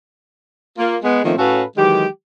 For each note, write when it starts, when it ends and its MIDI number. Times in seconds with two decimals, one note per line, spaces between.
0.78 0.96 58
0.78 0.96 65
1.03 1.20 56
1.03 1.20 59
1.24 1.34 51
1.24 1.34 53
1.24 1.34 57
1.24 1.34 58
1.24 1.34 60
1.24 1.34 61
1.38 1.62 45
1.38 1.62 61
1.38 1.62 66
1.38 1.62 69
1.38 1.62 71
1.38 1.62 77
1.77 2.05 51
1.77 2.05 52
1.77 2.05 54
1.77 2.05 56
1.77 2.05 67